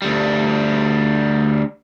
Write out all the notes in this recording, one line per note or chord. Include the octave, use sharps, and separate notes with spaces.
D2 G3